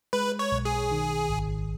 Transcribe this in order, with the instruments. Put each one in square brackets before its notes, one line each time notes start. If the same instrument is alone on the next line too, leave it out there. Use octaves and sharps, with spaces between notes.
[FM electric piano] G#3 [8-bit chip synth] B4
[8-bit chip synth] C#5
[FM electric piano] B1
[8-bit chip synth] G#4
[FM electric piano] D#3
G#1